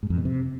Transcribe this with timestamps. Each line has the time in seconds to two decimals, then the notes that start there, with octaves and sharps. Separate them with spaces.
0.03 G#2
0.10 F2
0.18 B2
0.25 C3